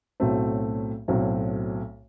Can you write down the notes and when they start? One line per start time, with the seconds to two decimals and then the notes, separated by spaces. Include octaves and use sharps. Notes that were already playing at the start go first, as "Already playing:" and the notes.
0.20 B1 A2 F#3 A3 C4
1.08 B1 A2 F#3 A3 C4